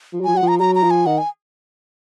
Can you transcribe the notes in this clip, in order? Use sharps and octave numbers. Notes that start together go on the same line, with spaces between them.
F3
F#3
F3 G#5
F#3 F#5
F3
A#5
F#3 A#5
A#5
F3
G#5
D#3 F#5
G#5